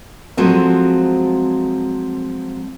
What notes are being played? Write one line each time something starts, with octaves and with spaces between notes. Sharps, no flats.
F3 F#3 G#3 A3 C4